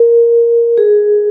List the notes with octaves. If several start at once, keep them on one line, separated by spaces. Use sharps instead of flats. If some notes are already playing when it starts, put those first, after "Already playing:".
Already playing: A#4
G#4